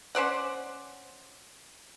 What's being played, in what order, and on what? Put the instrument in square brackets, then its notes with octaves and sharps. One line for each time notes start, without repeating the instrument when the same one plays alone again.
[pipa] C#4 C5 D5 F#5